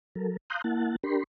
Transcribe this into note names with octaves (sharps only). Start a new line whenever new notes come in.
F#3 A4 A#4
F5 A#5 C6 D#6 F#6 G6
A#3 E4 F#5 A5
D4 G4 A#4 B5 C6